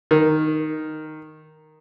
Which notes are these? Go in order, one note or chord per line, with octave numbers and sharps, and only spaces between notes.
D#3